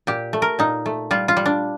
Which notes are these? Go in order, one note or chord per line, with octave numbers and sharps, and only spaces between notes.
A#2 G4
A3
A#4
A#2 D#4
A3
G3 F4
F4
G3
D4